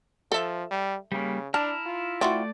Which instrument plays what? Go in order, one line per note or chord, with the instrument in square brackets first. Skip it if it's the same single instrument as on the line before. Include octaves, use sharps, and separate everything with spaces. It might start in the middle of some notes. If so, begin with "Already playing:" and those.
[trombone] F3 [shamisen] A4 E5
[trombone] G3
[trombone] C#3 [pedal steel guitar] G3 A#3
[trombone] D4 [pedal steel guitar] E4 A#5 F6 [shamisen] A5
[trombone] F4
[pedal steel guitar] A3 D5 [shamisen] C4 E4 F#4